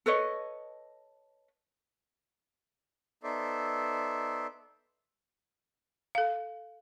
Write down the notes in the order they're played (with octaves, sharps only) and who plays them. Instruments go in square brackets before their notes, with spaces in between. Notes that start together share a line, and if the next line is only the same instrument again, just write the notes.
[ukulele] A4 B4 C#5 D#5
[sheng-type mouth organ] B3 D#4 A4 C5 D5 E5
[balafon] A4 F5